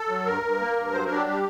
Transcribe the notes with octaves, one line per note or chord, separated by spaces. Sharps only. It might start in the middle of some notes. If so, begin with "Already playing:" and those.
Already playing: A4
F#3
G2 A#4
G2
A#3
G2
F#3 C5
A#4
D4
G4
G3 G4